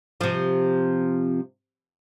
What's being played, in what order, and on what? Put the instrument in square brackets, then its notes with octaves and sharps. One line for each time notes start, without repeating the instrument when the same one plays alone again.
[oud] C3 F3